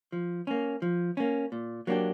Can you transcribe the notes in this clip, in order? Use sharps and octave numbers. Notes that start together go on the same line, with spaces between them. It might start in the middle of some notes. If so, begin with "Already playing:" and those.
F3
A#3 C#4
F3
A#3 C#4
A#2
F#3 A#3 D4 G4